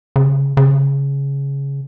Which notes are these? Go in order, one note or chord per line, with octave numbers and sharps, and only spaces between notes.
C#3
C#3